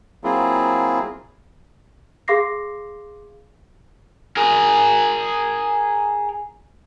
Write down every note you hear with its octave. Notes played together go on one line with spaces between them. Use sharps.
F#3 A#3 C4 E4 F4 G#4
G#4 F5 C6 D6 A#6 C7
G#4 A#4